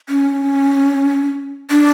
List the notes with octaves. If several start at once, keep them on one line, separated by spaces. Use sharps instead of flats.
C#4
D4